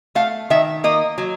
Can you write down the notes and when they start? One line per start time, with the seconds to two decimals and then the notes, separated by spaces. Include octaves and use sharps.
0.15 A3 F5
0.50 D#3 E5
0.84 A#3 D#5
1.18 F#3